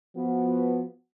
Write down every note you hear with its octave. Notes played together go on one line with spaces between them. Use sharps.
F3 B3 F4 F#4 B4